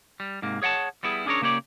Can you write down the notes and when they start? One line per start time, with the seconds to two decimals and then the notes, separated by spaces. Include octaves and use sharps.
0.20 G3
0.42 G#2 C3 A#3
0.62 G#4 C#5 F#5 G5 A5
1.03 G3 B3 E4 G#4
1.26 C#4 D4 G#4 A#4 C#5
1.42 C#3 A#3 G4 C#5 D5